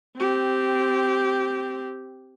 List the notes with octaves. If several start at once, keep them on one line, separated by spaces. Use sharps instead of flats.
C4 G4